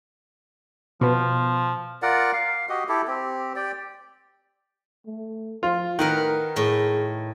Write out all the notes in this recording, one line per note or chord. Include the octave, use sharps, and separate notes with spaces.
B2 F3 B3
F4 A#4 D5 F#5
F5
F#4 G4 D#5
E4 G4 A4
C4 G4
G4 D5 G5
A3
F3 F4
A2 D#3 A#4 B4 F#5
A2 G#4